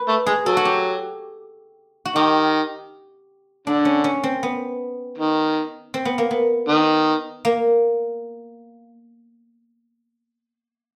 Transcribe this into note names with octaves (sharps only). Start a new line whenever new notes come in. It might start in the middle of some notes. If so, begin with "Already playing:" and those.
Already playing: B4
A3
G#3 G#4
F#3 A4
F#4
G4
F#4
D#3 G4
D3 D4
C#4
C#4
C4
B3
D#3
C4
B3
A#3
B3
D#3
A#3